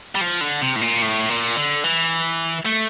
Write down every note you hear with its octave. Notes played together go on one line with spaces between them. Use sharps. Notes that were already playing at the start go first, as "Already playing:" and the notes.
G3
F3
D3
C3
A2
A#2
A2
A#2
D3
E3
A3